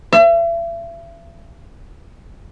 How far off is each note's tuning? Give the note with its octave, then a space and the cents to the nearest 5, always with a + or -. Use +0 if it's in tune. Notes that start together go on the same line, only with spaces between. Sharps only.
E5 +40